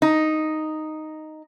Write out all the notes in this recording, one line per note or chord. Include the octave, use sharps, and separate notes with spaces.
D#4